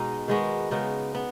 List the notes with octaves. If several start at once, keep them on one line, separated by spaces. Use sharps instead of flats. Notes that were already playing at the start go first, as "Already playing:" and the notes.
Already playing: B2 G#3 D#4
D#3 G#3 B3 F#4
C#3 G#3 B3 D#4
B3